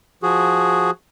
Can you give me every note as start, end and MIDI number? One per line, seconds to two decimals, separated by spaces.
0.23 0.90 53
0.23 0.90 66
0.23 0.90 68